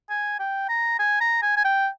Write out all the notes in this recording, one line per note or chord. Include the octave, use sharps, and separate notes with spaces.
G#5
G5
A#5
G#5
A#5
G#5
G#5
G5